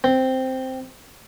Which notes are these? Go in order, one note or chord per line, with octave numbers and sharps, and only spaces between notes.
C4